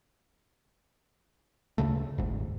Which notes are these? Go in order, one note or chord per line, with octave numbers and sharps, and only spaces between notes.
D2 C#3 A3
D#1 G#1 G#2